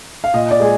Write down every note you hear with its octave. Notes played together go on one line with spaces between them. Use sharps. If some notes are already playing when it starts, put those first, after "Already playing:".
F5
A#2 D#5
D5
G#3 G#4